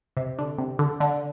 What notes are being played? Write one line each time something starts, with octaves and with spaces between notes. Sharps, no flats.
C3
D3
C3
D3
D3